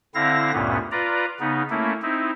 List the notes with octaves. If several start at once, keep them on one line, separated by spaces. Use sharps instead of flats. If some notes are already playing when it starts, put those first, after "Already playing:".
D3 C4 E4 F5 A#6
D2 G2 A#2 B3 C#4
F4 B4 D5 A#5
C#3 B3 D#4
A3 A#3 C#4 E4
C4 D#4 E4